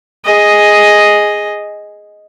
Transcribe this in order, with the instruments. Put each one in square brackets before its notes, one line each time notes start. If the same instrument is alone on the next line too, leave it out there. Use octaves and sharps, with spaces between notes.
[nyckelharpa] G#4 D#5